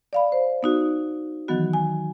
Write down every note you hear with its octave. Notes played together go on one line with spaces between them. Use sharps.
D5 F5 B5
C5
B3 D#4 F#4
D#3 E3 F#3 B3 F#4
G#5